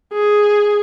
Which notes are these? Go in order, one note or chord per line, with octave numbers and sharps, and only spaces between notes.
G#4